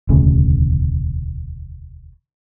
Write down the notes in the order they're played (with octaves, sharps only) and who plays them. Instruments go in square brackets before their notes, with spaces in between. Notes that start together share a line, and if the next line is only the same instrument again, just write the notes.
[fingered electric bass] E1 D2 C#3